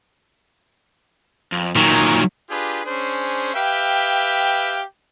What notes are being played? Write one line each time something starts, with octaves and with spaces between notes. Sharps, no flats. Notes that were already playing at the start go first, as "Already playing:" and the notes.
F2
A#2 D#3 F#3
D4 F4 G4 G#4 B4
C#4 D4 G#4 C5
G4 B4 E5 F5 G5